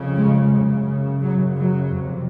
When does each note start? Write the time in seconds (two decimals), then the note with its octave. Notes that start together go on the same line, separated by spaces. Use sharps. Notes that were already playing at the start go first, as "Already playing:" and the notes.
Already playing: F2 C#3
0.15 G#3
0.50 F#2 C#3
1.21 F#2 C#3 F#3
1.57 F#3
1.92 F2 C3